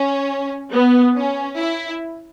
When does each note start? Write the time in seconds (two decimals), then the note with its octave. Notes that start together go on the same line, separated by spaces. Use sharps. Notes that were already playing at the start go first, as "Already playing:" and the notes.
Already playing: C#4
0.72 B3
1.17 C#4
1.59 E4